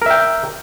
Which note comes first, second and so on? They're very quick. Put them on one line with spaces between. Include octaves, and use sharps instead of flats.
A#4 E5 G5